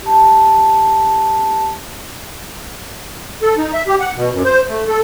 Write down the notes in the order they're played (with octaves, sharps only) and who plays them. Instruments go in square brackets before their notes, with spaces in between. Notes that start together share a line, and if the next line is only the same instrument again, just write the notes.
[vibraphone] G4 A5
[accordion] A4
D#4
E5
G4
F#5
B2
F#2
C5
A3
A4